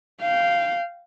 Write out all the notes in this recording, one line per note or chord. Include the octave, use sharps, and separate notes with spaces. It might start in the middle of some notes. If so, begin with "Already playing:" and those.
F5 G5